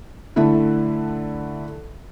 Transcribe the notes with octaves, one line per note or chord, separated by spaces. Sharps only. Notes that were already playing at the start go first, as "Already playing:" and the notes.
D3 A3 E4